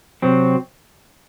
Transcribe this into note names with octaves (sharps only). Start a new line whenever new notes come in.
C3 F#3 C4